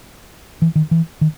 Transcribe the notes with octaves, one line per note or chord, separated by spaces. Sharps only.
E3
D#3
E3
D#3